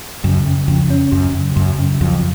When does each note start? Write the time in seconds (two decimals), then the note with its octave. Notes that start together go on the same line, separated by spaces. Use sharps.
0.24 F#2 C#3
0.46 C#3
0.68 F2 C#3
0.90 C#4
1.12 F#2 F#3
1.35 C#3
1.56 F#2 F#3
1.79 C#3
2.01 F2 F#3